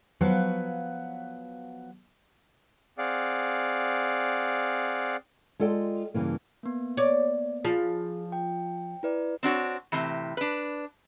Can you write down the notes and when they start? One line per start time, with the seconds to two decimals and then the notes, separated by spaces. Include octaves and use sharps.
0.21 F3 F#3 B3 F#4 B4 F5
2.98 C4 G#4 D5 F5 F#5
5.60 G#3 F4 A4 D5 G5
6.14 G2 C#3 E3 A#3
6.63 A#3 B3
6.97 C#5 D5
7.65 F3 F4 G#4
8.32 G5
9.03 E4 B4 D5
9.43 C4 D4 F#4 C#5
9.92 A2 C3 E3
10.37 D4 B4